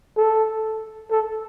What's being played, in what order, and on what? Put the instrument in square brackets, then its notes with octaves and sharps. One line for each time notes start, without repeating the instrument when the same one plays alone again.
[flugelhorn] A4
A4